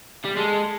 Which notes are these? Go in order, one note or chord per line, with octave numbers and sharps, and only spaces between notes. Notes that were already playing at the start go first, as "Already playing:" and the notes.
G3
G#3 A4